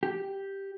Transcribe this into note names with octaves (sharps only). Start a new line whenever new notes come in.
G4